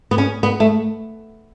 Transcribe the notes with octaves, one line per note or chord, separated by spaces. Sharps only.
B3
C#4
B3
A3